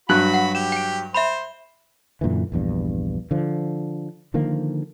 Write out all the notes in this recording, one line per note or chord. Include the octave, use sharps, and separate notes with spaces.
G2 F#3 F#4 B5 F#6 F#7
F#5
G4 E7
G5 D7
C5 E5 B5
F#2 A#2 D3 E3
A#1 E2 G2
D3 F3
D3 D#3 F3 A#3